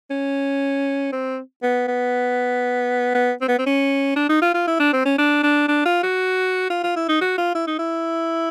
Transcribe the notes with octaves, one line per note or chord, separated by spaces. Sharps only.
C#4
C4
B3
B3
B3
C4
B3
C4
C#4
D4
D#4
F4
F4
E4
D4
C4
C#4
D4
D4
D4
F4
F#4
F4
F4
E4
D#4
F#4
F4
E4
D#4
E4